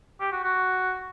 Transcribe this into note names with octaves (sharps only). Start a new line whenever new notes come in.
G4
F#4
F#4